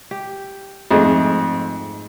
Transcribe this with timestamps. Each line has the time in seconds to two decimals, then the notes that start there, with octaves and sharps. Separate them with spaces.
0.11 G4
0.91 F2 G#2 G#3 A3